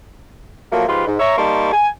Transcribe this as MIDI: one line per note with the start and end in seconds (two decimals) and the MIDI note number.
0.72 0.86 53
0.72 0.86 54
0.72 0.86 57
0.72 0.86 58
0.88 1.07 44
0.88 1.07 53
0.88 1.07 65
0.88 1.07 67
0.88 1.07 71
0.88 1.07 84
1.07 1.19 44
1.20 1.37 73
1.20 1.37 76
1.20 1.37 82
1.38 1.68 55
1.38 1.68 58
1.38 1.68 63
1.38 1.68 81
1.38 1.68 84
1.38 1.68 85
1.73 1.89 80